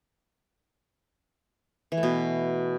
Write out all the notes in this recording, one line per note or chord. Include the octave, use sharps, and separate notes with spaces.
E3
A3
B2